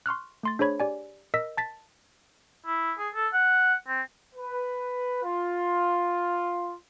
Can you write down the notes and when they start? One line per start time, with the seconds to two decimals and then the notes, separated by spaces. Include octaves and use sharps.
0.06 C6 C#6 F6 F#6
0.43 A3 C6 A6
0.59 D4 G#4 C5 C#5 B5 G#6
0.80 G4 D5 G#5
1.34 A#4 D#5 E6 A#6 B6
1.57 A5 A6 B6
2.66 E4
2.98 G#4
3.14 A4
3.33 F#5
3.88 C4
4.35 B4
5.23 F4